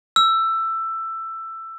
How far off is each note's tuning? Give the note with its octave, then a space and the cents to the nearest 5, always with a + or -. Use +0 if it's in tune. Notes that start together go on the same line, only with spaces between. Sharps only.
E6 +15